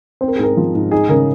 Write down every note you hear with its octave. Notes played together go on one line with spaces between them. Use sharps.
C4 C5
A#4
G#4
G#2 A#4
F3
G#2
D#4 G#4
C#3 A#4